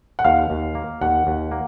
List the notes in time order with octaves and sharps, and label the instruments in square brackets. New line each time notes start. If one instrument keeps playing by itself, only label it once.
[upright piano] F#5
[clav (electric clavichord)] D#2 [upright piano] F5
[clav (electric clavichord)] D#2
A#3
[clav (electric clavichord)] D#2 [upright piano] F#5
[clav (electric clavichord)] D#2
A#3